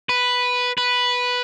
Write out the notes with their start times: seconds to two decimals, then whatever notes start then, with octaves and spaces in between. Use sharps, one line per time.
0.09 B4
0.78 B4